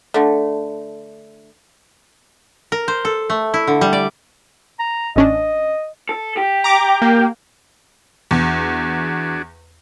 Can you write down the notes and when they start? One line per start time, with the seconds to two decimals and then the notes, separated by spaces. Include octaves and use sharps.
0.14 D3 A3
2.72 A#4
2.88 C5
3.05 A4
3.30 A3
3.54 E4
3.67 D3
3.81 G3
3.93 D5
4.79 A#5
5.16 A1 C#4 D4 D#5
6.09 A4
6.37 G4
6.64 A#5 D6
7.02 A#3
8.31 E2 D4 F#4 G#4